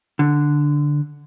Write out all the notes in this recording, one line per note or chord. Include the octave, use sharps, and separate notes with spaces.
D3